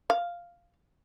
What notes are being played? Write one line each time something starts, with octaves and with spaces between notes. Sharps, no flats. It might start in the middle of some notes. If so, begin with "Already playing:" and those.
F5